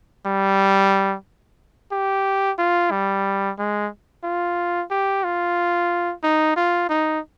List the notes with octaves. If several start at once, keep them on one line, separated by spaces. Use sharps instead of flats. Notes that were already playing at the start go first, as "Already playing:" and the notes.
G3
G4
F4
G3
G#3
F4
G4
F4
D#4
F4
D#4